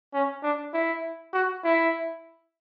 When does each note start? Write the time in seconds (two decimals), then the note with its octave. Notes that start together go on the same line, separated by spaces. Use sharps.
0.14 C#4
0.43 D4
0.74 E4
1.34 F#4
1.64 E4